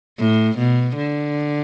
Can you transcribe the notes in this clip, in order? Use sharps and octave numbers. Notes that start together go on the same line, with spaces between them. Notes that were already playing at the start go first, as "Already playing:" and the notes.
A2
B2
D3